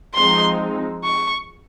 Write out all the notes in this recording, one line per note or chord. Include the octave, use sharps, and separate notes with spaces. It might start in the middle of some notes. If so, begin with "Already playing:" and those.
F3 G#3 C4 D#4 C6
C#6